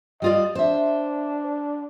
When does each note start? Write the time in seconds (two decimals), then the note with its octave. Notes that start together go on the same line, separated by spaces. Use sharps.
0.22 G3 F4 D5 D#5
0.55 D4 C5 E5